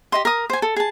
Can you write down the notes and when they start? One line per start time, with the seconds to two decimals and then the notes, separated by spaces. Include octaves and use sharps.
0.12 G4 D#5 C6
0.25 A#4 D#6
0.50 C5 G#5
0.62 A4
0.76 G#4 A5